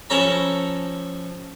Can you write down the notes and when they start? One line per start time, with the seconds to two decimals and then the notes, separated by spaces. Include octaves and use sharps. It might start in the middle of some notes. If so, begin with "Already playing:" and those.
0.10 F3 C#4 A4 C#5 A#5 B5